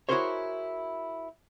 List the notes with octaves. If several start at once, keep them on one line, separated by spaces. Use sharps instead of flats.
E4 F#4 G#4 A#4 C5 C#5